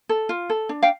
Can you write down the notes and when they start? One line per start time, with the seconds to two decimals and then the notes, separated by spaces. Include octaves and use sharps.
0.09 A4
0.29 F4
0.50 A4
0.69 D4
0.82 F5 G5